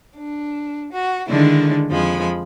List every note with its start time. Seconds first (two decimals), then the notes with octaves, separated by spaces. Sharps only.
0.16 D4
0.92 F#4
1.28 D3 D#3 G#3 D4 E4
1.90 F2 F3 G#3 B5